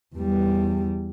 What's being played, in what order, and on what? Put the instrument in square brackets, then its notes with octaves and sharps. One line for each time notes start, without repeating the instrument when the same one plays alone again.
[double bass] E2 G3